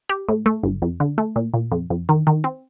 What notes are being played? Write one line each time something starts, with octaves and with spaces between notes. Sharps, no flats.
G4
A2
A3
G1
F2
D3
A3
A#2
A#2
F2
F2
D#3
D#3
C4